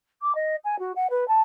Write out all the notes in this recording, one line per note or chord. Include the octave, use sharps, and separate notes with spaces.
D6
D#5
G#5
F#4
F#5
B4
A5